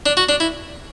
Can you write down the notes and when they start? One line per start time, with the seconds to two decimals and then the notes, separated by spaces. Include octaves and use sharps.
0.06 D4
0.17 F#4
0.29 D4
0.40 E4